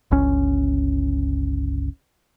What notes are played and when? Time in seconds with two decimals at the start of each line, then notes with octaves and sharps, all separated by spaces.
0.11 G1 C#2 C#4